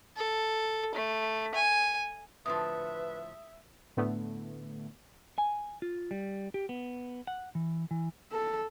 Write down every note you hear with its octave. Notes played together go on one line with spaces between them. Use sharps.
A4
A3
G#5
A2 D3 F3 B4 E5 D#6
A2 D3 A3 B3
G#5
F4
G3
G4
B3
F#5
E3
E3
A4